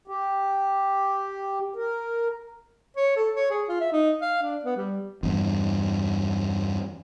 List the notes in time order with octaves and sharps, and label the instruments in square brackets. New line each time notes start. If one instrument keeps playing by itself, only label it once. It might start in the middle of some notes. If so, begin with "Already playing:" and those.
[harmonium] G4
A#4
[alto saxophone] C#5
A4
C#5
G#4
F4
E5
D#4
F5
D4
B3
G3
[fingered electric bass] E2 G2